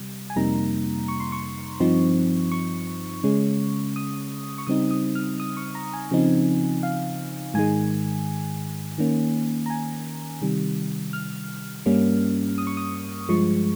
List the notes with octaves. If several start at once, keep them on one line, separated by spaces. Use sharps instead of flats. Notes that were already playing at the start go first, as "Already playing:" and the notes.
Already playing: C3 G3
G#5
F2 C3 G3 A#3 D#4 A#5
C#6
C6
C#6
G2 F3 C4 D#4
C#6
C#3 G#3 C#4
D#6
C#6
C#3 G3 C4 D#4 D#6
D#6
F6
D#6
C#6
A#5
G#5
C#3 F3 C4 D#4
F5
G#2 D#3 G#3 G#5
D#3 A#3 C#4
A#5
G#5
C3 D#3 G3
F6
G2 G3 A#3 C#4
D#6
C#6
D#6
G2 F3 G#3 C#6